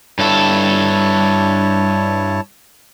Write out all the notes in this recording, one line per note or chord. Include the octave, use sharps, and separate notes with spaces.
G2 E4 A4 C#5 A5